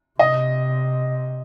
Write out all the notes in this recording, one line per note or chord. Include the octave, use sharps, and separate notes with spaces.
C3 D#5